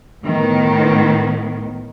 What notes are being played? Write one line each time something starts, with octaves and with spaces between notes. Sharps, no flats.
A2 D#3 B3